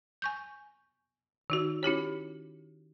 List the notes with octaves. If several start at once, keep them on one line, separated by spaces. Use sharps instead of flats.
G#5 C#6 G6
D#3 D#4 F#4
C#4 E4 G4 C#5